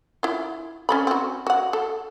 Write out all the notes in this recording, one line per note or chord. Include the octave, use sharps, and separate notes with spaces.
E4 F4
C#4 A4 B5
C4 F#4
F#4 F#5
A4